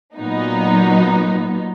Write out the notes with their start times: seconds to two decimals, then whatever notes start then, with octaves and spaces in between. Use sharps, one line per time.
0.17 A#2 F#3 B3 D#4